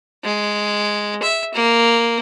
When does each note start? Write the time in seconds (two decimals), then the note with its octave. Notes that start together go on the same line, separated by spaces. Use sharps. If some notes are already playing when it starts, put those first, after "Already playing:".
0.24 G#3
1.22 E5
1.54 A#3